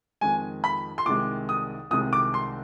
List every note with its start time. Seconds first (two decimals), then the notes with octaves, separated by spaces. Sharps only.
0.21 F2 D#3 G#3 G#5
0.64 B5
0.98 C6
1.06 C2 C3 D#3 G#3 D6
1.49 D#6
1.91 C2 C3 D#3 G#3 D#6
2.13 D6
2.34 C6